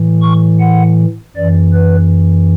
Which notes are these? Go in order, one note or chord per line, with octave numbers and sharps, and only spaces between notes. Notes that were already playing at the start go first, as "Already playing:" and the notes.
Already playing: A2 E3
C#6
F#5
F#2 E3 D5
B4